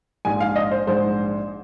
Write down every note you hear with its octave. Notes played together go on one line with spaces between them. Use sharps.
A#1 G#2 G#3 G#5
F5
D#5
C5
A#1 G#2 G#3 C5